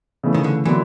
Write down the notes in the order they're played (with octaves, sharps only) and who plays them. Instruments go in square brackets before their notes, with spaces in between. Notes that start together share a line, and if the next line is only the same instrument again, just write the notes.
[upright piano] C#3 E3 A3
[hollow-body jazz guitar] D#3
D3
[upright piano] D3 F#3 A#3 [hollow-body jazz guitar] E3